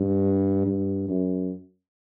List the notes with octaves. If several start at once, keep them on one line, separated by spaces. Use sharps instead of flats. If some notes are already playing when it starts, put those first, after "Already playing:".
Already playing: G2
G2
F#2